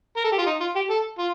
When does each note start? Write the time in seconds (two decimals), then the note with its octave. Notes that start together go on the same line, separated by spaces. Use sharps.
0.17 A#4
0.24 A4
0.32 G4
0.38 F4
0.46 D#4
0.60 F4
0.76 G4
0.90 A4
1.18 F4